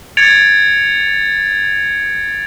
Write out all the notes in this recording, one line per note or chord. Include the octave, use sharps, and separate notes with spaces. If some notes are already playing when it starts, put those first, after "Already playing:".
G#6 A6 C#7 D7 F7